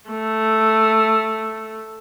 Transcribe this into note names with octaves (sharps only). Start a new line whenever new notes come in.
A3